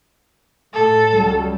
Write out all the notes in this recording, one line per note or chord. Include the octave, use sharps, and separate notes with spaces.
A2 A4
C#2 F#3 G3